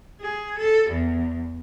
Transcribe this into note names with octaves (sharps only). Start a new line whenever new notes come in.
G#4
A4
E2